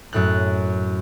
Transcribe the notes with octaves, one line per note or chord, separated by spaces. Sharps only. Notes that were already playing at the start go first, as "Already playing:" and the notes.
F#2 A2 F#6